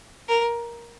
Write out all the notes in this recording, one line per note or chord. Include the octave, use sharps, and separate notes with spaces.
A#4